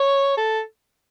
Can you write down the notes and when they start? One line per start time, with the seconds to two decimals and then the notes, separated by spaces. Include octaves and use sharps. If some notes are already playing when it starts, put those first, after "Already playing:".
Already playing: C#5
0.37 A4